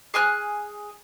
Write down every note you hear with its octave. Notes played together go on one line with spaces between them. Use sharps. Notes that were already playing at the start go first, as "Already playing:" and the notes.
G#4 G#5 F6 F#6